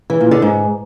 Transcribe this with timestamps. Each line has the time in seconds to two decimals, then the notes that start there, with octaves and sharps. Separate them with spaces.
0.10 E3
0.20 A#2
0.31 D3
0.42 G#2